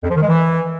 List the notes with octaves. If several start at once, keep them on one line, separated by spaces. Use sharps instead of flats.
F2
F3
D#3
G#3
E3